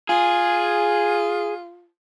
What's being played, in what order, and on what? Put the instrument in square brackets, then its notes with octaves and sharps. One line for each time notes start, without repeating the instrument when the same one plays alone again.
[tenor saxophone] F4 [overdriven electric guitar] G#4